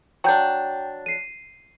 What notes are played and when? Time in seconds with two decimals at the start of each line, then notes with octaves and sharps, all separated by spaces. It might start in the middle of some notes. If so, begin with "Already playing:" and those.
0.24 F#3 D4 G5 G6
1.06 C7 D#7